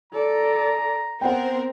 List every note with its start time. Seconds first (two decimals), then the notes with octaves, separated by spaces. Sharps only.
0.13 A4 D5 A#5
1.21 B3 C4 A#4 F#5 G5